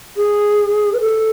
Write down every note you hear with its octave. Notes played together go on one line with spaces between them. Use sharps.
G#4
B4
A4